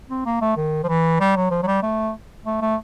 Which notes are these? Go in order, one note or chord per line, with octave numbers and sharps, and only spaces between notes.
C4
A#3
A3
D#3
F3
E3
G3
F#3
F3
F#3
G3
A3
A3
A3